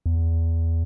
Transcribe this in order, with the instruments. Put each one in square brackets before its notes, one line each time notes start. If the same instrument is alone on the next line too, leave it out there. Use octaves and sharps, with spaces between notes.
[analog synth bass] E2